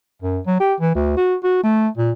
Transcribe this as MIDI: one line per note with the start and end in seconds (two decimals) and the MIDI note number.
0.22 0.39 42
0.47 0.60 54
0.60 0.74 67
0.80 0.93 52
0.95 1.16 38
1.17 1.35 66
1.43 1.59 66
1.63 1.88 57
1.97 2.12 46